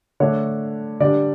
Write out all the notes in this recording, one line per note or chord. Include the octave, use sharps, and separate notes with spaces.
D3 A3 D4 C#5
D3 G3 D4 D5